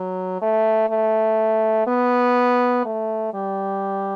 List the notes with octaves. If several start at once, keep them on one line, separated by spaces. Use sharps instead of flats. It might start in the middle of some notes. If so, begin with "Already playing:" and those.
Already playing: F#3
A3
A3
B3
A3
G3